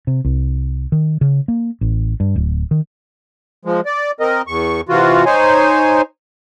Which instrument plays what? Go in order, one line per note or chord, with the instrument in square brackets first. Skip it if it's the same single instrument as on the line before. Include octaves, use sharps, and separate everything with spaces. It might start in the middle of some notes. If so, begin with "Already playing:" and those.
[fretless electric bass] C3
C2
D#3
C#3
A#3
A1
G2
D1
D#3
[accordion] F3 G#3
D5
C4 A#4 D#5
E2 C#6
C3 E3 F4 F#4
D#4 C5 C#5 G#5